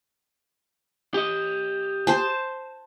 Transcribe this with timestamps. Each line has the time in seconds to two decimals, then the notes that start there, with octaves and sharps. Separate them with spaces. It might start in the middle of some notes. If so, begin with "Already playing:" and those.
1.14 G4 D#5
2.07 C5 A5